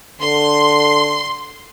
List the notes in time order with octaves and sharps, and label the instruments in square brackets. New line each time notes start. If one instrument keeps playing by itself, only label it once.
[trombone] D3 [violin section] C6